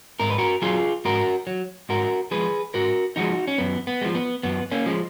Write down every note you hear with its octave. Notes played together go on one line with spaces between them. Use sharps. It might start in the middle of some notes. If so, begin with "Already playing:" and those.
G#2 A#4
B4
F#4 A#4
F#3 F4 G#4
G#2 F#4 A#4
F#3
G#2 F#4 A#4
F3 G#3 G#4 B4
G#2 F#4 A#4
F3 G#3 D#4 F#4
C#4
F#2 B3
B3
F3 G#3
B3
F#2 B3
A#3 C#4
F3 G#3